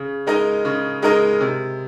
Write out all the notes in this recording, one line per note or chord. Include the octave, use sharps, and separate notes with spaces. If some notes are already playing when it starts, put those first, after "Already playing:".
Already playing: C#3
G#3 D#4 A#4 D#5
C#3
G#3 D#4 A#4 D#5
C3